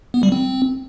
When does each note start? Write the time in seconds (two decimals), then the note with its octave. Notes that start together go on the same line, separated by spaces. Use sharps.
0.14 B3
0.23 G3
0.32 C4